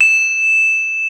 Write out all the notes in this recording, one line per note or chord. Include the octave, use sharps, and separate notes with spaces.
E7